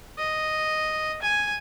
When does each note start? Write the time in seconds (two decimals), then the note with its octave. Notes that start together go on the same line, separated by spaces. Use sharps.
0.18 D#5
1.22 G#5